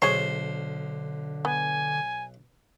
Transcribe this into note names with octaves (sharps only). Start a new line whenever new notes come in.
B1 D3 G#4 C5 C#5
B3 G#5